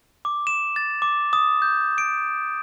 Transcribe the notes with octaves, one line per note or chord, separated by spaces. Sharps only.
D6
E7
A6
D6
D#6
G6
D7